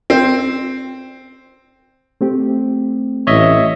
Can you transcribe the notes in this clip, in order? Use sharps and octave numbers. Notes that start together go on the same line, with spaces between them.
C4
A3 C4 G4
A1 C#5 D#5 E5